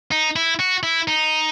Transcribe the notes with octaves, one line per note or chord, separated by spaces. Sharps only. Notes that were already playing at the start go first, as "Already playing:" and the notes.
D#4
E4
F#4
E4
D#4